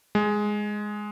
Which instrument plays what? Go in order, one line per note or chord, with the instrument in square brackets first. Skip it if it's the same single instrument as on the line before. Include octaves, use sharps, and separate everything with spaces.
[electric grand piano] G#3